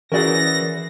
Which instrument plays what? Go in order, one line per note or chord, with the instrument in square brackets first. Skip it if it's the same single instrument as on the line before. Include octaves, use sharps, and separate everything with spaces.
[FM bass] E3 [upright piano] C#4 F#4 G#4 [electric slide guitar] A#4 D5 [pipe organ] A#6